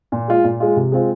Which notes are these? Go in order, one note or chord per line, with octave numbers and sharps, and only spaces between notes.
A#2
G#3 F4
A#2
G#3 F4
C3
G#3 C4 F4